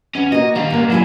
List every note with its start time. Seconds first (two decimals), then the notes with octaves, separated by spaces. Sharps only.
0.15 E2 C#4
0.32 A#3 F#4 D#5
0.55 D#3 G3 F5
0.70 G#2 A#3
0.90 D#2 F#3 E4 G#5